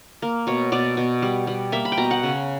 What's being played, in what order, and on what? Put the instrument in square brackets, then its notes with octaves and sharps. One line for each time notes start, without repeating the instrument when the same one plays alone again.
[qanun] A#3
B2 C#5
B2 D5
B2
G3
G3
A#3 E5
B5
G5
B2 A#5
F#5
C#3